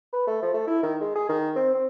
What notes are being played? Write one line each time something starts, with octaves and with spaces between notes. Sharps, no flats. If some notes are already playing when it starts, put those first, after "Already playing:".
B4
A3
F3
A3
E4
D#3
G#3
G#4
D#3
C4
C4